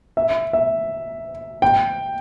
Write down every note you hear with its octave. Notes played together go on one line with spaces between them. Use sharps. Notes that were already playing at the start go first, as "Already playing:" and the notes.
E5
E5
G5